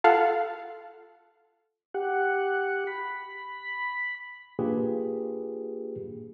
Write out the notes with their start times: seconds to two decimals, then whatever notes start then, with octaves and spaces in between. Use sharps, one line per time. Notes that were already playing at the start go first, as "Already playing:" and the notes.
0.04 F4 A4 F5 F#5 A5
1.94 G4 F#5
2.87 B5
4.59 A#3 D4 F4 G4 G#4 B4